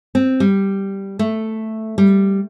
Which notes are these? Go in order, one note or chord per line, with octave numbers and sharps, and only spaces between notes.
C4
G3
A3
G3